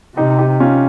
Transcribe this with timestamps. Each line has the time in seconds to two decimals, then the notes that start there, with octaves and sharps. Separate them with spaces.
0.16 C3 D#4 G4
0.38 D#4 G4
0.60 C#4 F4